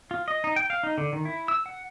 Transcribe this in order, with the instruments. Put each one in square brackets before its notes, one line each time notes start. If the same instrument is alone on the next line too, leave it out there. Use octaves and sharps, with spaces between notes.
[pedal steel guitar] F4
D#5
D#4
G5
F5
D#4
D3
D#3
E4
E6
F#5